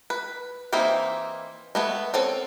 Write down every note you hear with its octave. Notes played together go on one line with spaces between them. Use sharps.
B4
E3 A#3 C4 D#4 E4
G#3 A3 B3
C4 C#4 A4